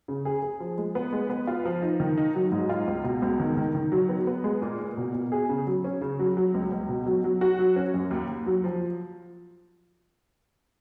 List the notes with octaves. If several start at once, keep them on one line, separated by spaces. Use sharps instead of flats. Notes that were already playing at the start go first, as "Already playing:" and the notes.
C#3
G#4
G#4
F3
G#3
B3
G#3
B3
F4
F3
D#4
D#3
D#4
F#3
G#2
F4
C#2
B2
C#2
D#3
D#3
D#3
F#3
B3
B3
G#3
A#2
A#2
B2
B2
G#4
C#3
F#3
C#4
C#3
F#3
F#3
C#2
C#2
B2
F#3
F#3
F#4
F#3
C#4
F#2
D#2
D#2
F#3
F3